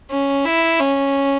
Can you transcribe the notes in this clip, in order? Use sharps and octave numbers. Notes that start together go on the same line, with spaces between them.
C#4
E4
C#4